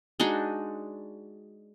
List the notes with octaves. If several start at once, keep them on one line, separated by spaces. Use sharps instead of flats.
G#3 D4 D#4 F#4